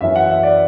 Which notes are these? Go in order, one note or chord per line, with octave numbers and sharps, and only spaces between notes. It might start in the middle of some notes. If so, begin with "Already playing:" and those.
F#2 E3 E5
F#5
E5
D5